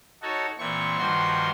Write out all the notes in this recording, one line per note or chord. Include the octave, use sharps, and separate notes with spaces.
D#4 F#4 A4 C#5
A#2 E3 C4 C#6
G2 D#3 F3 F#4 C6